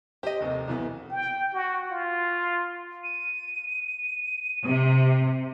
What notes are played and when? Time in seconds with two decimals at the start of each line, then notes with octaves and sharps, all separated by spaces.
0.23 G4 C5 D#5
0.40 F1 D#2 C3
0.68 B1 E3 B3
1.11 G5
1.53 F#4
1.91 F4
3.03 D#7
4.66 C3